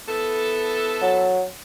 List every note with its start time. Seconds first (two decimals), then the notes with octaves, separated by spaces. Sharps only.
0.08 B3 E4 A4
1.02 F#3